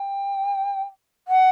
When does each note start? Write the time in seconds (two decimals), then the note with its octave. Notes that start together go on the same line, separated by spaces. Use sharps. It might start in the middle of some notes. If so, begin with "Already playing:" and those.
Already playing: G5
1.28 F#5